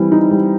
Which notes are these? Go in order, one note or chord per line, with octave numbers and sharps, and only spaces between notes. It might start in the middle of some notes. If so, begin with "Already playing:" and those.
Already playing: E3 G3 C4
D#4
G3